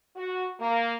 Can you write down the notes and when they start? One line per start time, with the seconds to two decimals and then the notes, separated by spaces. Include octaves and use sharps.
0.17 F#4
0.60 A#3